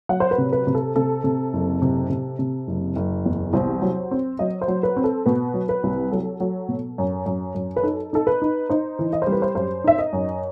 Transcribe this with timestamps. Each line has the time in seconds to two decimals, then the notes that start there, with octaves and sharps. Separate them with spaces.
0.09 F#3 F#5
0.20 C5
0.31 B4
0.38 C3
0.52 B4
0.67 C3
0.75 A4
0.96 C3 A4
1.24 C3
1.53 F#1
1.82 C3
2.10 C3
2.39 C3
2.68 F#1
2.96 F#1
3.26 E2
3.53 C2 C5
3.82 F#3
4.11 C4
4.39 F#3 D#5
4.61 C5
4.68 F#3
4.83 B4
4.97 C4
5.04 A4
5.26 B2 B4
5.54 F#3
5.69 B4
5.83 C2
6.12 F#3 A4
6.40 F#3
6.69 B2
6.98 F#2
7.26 F#2
7.55 F#2
7.76 B4
7.83 D#4 A4
8.13 D#4 A4
8.27 B4
8.42 D#4
8.69 D#4 C5
8.99 E3
9.13 D#5
9.22 C5
9.27 G3
9.32 B4
9.42 C5
9.55 F#2 C5
9.84 D#4 E5
9.99 D#5
10.13 F#2